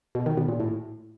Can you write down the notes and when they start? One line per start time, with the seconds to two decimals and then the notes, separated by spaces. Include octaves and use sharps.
0.15 B2
0.26 D#3
0.37 B2
0.48 A#2
0.60 A2